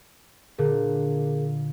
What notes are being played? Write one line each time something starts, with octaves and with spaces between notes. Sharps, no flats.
A#2 D3 G#4 A#4